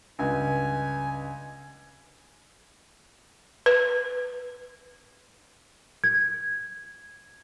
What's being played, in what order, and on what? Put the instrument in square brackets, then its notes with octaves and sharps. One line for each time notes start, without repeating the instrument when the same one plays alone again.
[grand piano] C#2 G2 [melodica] G#5
[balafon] B4
[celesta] G#6